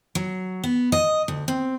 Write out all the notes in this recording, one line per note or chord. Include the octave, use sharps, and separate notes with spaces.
F#3
B3
D#5
D2
C4